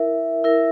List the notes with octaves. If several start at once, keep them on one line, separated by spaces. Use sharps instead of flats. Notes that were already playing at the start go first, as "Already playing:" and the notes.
Already playing: E4 A#4 E5
E4 A#4 E5